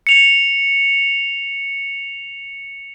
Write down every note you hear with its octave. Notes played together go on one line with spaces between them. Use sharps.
C#7 F7